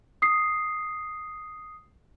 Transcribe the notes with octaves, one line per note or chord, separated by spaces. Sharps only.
D#6 C7